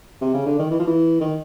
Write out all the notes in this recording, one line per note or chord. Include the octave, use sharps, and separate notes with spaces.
C3
C#3
D3
D#3
E3
F3
E3
D#3